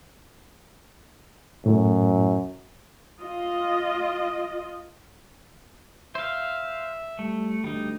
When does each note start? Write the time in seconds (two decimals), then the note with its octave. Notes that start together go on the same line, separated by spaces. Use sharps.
1.66 F#2 A2
3.21 F4 D#5
6.15 C5 E5 F5
7.19 G3 A3
7.64 D2 G3 D#4